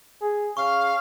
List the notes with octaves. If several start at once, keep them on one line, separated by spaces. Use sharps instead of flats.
G#4
C#3 F5 C#6